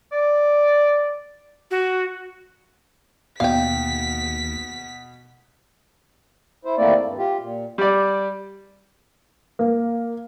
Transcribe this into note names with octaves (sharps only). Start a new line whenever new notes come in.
D5
F#4
D#2 B2 F5 G5 B6
E4 C5
D#2 A3 A#3 C4 E4 D5
G2
F4 G4
A#2
G3 D5
A#3